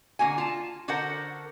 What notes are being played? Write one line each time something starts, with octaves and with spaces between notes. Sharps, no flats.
D3 A#3 F#4 G#5
F4 A5
D3 F#4 A4 A#4 C5 F#5